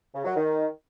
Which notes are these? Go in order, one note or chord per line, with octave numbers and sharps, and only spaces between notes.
C#3
F#3
D#3